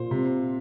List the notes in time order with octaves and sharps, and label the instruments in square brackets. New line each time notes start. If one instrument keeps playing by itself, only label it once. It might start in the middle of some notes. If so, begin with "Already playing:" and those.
Already playing: [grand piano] A#2 [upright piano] C5
[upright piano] C3